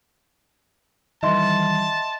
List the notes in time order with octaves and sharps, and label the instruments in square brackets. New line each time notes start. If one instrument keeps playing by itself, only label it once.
[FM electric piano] D#3 E3 G3 [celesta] D#5 E5 C6 [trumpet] A5